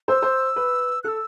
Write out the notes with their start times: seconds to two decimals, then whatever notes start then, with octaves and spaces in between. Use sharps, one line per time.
0.08 C5 E6
0.22 C5
0.56 B4
1.03 A4 E6 F#6